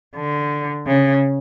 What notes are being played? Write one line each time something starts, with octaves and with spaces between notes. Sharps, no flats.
D3
C#3